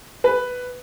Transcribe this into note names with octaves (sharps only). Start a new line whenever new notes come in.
B4